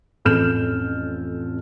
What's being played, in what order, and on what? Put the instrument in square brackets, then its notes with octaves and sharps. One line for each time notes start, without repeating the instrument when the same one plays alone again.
[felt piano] A1 F2 A4 F6 G6 E7